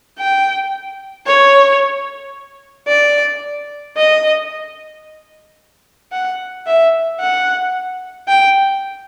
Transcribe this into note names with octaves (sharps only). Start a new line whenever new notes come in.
G5
C#5
D5
D#5
F#5
E5
F#5
G5